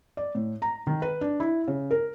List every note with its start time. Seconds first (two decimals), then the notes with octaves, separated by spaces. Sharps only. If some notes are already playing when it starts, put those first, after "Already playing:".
0.17 D5
0.35 A2
0.62 A#5
0.87 D#3
1.02 B4
1.21 D4
1.40 E4
1.67 C#3
1.91 A#4